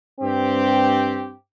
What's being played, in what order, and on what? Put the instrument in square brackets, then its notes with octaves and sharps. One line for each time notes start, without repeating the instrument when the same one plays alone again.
[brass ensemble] G2 C4 G4